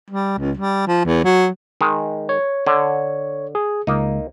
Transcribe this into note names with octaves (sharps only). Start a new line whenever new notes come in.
G3
C#2
G3
F3
E2
F#3
D#3 G#3
C#5
D3 C#5
G#4
C#2 A#3 D#4